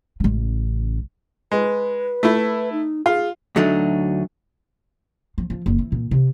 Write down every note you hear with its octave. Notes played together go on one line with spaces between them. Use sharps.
A1 C#3
G#3 B4
A3 E4
D#4
F4 G#4
D2 F#3 A3 D4 D#4
F3
F3
F#1
E3
A#2
C3